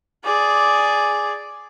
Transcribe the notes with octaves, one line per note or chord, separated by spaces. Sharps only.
G#4 D5